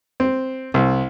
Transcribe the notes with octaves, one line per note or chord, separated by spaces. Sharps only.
C4
C2